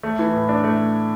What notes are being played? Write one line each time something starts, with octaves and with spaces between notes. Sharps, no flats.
A3
E3
A2
D4
A3